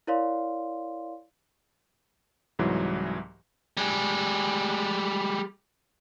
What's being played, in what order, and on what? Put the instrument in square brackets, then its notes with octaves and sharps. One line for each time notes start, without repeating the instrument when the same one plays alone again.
[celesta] E4 A#4 C#5 D5 F5 C6
[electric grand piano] C2 G#2 E3 F#3
[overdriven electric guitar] G3 G#3